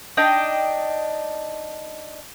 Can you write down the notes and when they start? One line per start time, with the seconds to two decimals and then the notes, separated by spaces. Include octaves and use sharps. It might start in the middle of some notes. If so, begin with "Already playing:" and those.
0.17 D4 D#4 D#5 G5